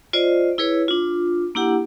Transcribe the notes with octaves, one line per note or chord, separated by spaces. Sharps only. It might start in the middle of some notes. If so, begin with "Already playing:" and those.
F4 C5 D5 D#5
E4 G#4 B4 C#5
D4 F4
A#3 D4 E4 G4 F#5